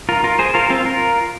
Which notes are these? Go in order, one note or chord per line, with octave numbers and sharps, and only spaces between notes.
F4 A#4
F4 A#4
G#4 C5
F4 A#4
C4 F4
F4 A#4